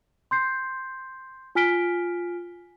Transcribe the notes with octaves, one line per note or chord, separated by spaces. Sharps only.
C6 G6 C7
F4 G#5 F6 B6 D7 G7